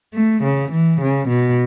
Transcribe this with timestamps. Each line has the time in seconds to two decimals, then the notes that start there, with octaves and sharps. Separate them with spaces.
0.14 A3
0.43 C#3
0.72 E3
1.01 C#3
1.29 B2